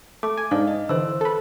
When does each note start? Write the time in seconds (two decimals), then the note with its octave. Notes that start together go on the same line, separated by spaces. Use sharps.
0.23 A3 D6
0.37 G#5
0.51 G#2 D4 D#4 F5
0.68 D#5
0.89 D3 E3 C5 E6
1.21 A4 B4